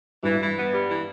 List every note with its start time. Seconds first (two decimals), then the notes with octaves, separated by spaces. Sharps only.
0.23 G2 E3
0.34 G2
0.40 E3
0.56 B3
0.73 G3
0.89 E3